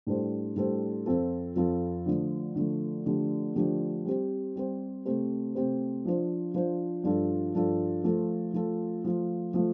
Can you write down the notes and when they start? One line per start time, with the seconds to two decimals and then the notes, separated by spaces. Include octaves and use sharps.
0.07 A2 G3 D4 A4 C5
0.56 A2 G3 D4 A4 C5
1.06 F2 F3 C4 F4 A4
1.56 F2 F3 C4 F4 A4
2.06 D3 F3 A3
2.56 D3 F3 A3
3.06 D3 F3 A3 D4 G4
3.56 D3 F3 A3 D4 G4
4.05 G3 C4 G4 C5
4.56 G3 C4 G4 C5
5.05 C3 A3 C4 G4 C5
5.55 C3 A3 C4 G4 C5
6.05 F3 D4 F4 C5
6.54 F3 D4 F4 C5
7.04 G2 F3 D4 F4 A4
7.55 G2 F3 D4 F4 A4
8.04 F3 A3 F4 A4
8.54 F3 A3 F4 A4
9.04 F3 A3 F4
9.54 F3 A3 F4